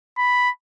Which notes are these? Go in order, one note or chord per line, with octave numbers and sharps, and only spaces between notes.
B5